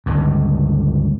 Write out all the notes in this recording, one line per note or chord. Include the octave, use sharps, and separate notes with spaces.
G1 C#2 G2